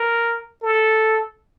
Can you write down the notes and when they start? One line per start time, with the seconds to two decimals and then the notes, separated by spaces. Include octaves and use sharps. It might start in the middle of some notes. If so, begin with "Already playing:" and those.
Already playing: A#4
0.62 A4